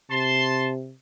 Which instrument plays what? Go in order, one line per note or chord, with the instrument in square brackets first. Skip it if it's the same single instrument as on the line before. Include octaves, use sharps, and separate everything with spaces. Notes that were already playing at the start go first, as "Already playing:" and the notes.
[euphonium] C3 [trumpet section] A5 C6